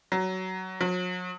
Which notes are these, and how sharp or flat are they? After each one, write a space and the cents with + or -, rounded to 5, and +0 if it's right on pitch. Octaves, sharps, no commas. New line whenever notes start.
F#3 +15
F#3 -40